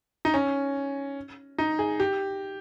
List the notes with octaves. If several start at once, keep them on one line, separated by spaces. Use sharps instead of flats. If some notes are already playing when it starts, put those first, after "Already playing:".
D#4
C#4
D#4
G#4
G4